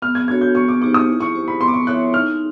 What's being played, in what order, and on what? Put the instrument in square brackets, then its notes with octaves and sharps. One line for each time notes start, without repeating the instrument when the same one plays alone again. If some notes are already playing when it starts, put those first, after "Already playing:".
[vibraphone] B3 [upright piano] F6
[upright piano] G#6
[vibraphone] D4 F#4 A4 C#5 [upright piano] G#6
[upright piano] G6
[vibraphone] B3 [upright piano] C#6
[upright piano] D6
[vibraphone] D#4 G4 C5 [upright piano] D6
[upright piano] D#6
[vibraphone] E4
[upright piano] C#6
[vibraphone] G4 C5
[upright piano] B5
[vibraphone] B3 [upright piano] C6
[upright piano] D6
C#6
[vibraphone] E4 A4 C#5 E5 [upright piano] F#6
[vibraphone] D#4 [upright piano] F6